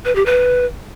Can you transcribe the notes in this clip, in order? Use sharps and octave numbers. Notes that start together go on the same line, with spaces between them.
B4
G4
B4